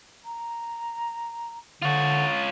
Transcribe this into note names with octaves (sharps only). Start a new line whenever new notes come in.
A#5
D3 F4 C#5 A6